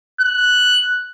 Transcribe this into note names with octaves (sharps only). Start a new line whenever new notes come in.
F#6